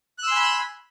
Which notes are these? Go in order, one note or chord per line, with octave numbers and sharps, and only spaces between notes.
G#5 B5 C6 E6 F#6